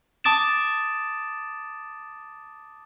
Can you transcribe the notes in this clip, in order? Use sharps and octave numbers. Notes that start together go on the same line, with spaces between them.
A5 D6 D#6 A6 D7 E7